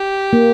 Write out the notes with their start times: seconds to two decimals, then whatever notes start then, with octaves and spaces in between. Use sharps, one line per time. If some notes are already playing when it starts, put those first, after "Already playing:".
Already playing: G4
0.33 A#3